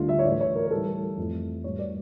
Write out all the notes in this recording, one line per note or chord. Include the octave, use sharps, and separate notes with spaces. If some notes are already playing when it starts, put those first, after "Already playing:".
Already playing: D2 D3 G3 F4
E5
C#5
A2 E3 A3 D5
C#5
A#4
A#4
A2 E3 G3 A4
F2 E3 A3
A2 E3 G3 C#5
D5